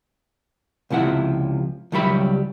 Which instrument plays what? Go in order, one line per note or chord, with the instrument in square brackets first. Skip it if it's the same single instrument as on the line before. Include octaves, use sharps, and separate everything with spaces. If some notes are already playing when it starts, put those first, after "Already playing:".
[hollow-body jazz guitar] C#2 C3 F3 E4 F#5
C#2 D#3 F#3 G3 E5 B5